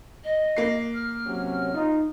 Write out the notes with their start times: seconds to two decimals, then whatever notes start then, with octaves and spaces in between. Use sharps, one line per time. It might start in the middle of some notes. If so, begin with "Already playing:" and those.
0.24 D#5
0.57 A#3 C7
0.94 F6
1.26 C3 F#3 C#4
1.74 D#4 F4